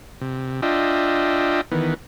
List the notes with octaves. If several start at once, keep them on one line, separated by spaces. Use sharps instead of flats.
C3
D4 F4 D#5 E5 G5
D#3 E3 B3